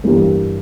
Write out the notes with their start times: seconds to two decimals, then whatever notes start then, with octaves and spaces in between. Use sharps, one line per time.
0.04 G1 G2 E3 G3 A#3